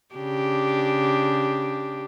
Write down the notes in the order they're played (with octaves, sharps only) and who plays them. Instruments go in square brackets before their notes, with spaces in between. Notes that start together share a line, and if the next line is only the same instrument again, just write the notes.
[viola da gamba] C#3 D4 G4